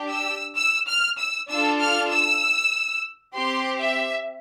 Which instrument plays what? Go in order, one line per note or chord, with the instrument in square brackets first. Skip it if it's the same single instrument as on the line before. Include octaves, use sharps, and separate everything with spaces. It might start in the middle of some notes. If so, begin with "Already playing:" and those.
Already playing: [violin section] D4 G4
E6
E6
F6
E6
D4 F4 A4 E6
F6
E6
C4 G4 C6
E5